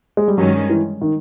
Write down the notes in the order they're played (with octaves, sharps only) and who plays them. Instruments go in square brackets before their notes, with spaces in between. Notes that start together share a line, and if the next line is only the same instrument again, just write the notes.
[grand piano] G#3
G3
[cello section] G2 D#3 G#3 C#4 [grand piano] F#3
[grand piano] E3
D#3